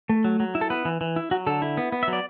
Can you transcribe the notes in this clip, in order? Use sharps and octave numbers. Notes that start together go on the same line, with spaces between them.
A3
F#3
F#3
E4
A4
B3 B4
E3
E3
E4
F#3 F#4
D3 A4
E4
B3
B3
E5
F#3
D5